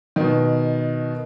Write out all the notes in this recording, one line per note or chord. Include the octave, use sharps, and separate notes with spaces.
B2 D#3